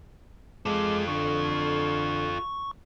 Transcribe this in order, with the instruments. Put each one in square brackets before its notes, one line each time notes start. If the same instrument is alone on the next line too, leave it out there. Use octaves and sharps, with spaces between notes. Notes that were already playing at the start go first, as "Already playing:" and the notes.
[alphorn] G#3 [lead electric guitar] F4 A4 [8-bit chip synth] D6
[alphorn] D3 [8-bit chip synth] C#6